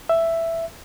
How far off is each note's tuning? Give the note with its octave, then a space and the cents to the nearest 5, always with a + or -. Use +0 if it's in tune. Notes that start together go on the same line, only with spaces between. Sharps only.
E5 +5